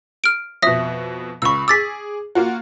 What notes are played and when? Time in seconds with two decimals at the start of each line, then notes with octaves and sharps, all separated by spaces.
0.24 F6 D7
0.62 F2 B2 E5 D#6 A#6
1.42 C#2 B5 C#6 E6
1.68 G#4 D6 E6 A6 B6
2.35 A#3 F4 F#4